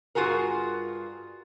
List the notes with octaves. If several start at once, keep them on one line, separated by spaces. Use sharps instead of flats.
G2 F4 F#4 G#4 A#4